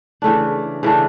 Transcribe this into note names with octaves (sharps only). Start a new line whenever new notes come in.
C#3 E3 A3 D4
C#3 E3 A3 D4